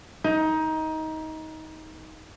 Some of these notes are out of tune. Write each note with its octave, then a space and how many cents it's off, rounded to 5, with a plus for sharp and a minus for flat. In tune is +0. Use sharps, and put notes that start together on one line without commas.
D#4 +20